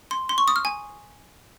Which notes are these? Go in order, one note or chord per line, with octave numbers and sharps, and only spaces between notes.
C6
C6
C#6
D#6
F6
G#5